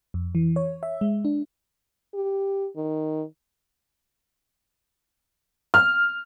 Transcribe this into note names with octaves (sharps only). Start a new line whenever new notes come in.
F2
E3
C#5
E5
G#3
D4
G4
D#3
F6